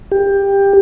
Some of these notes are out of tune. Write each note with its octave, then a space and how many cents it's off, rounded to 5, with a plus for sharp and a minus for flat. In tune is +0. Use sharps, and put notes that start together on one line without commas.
G4 +15